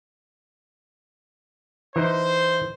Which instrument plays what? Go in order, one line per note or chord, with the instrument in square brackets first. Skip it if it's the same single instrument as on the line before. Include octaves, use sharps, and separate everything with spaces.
[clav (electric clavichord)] E3 D#4 [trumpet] C5